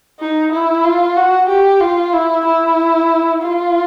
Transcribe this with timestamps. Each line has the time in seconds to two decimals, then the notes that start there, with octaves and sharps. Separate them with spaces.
0.20 D#4
0.52 E4
0.84 F4
1.17 F#4
1.49 G4
1.81 F4
2.13 E4
2.45 E4
3.43 F4